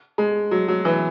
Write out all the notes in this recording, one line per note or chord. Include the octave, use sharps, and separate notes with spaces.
G#3
F#3
F#3
E3